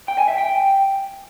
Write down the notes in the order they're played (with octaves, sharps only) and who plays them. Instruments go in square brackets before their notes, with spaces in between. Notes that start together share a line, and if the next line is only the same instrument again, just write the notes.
[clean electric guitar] G5
G#5
E5
G5